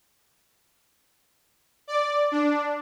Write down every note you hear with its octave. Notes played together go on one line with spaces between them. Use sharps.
D5
D4